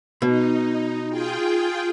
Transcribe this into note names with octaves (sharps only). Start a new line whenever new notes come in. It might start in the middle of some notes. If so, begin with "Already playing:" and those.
B2 D#4
F4 G#4 G5